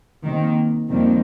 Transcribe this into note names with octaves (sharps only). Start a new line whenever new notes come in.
C3 D#3 A#3
F2 C3 D#3 G3 A#3